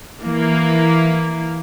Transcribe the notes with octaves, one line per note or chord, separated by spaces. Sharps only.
E3 A#3